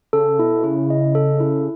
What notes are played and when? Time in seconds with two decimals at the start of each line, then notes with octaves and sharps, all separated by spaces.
0.13 C#3 A4
0.39 B2 E4
0.64 C#3 E4
0.90 D#5
1.15 A4
1.40 E4